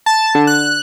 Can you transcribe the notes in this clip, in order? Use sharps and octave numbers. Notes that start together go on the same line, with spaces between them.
A5
D3
F#6